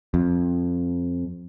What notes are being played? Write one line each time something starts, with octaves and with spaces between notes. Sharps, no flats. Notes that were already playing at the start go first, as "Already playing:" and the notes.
F2